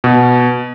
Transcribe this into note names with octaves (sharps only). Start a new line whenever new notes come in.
B2